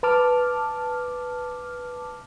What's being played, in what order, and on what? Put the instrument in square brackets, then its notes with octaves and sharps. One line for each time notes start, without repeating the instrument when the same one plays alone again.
[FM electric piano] B4 A5 D6 F6